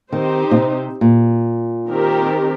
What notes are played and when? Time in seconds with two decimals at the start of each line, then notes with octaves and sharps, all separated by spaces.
0.12 D#3 C4 D#4 G4 C5
0.51 A#2
0.57 C3
1.01 A#2
1.89 D#3 C4 G4 A#4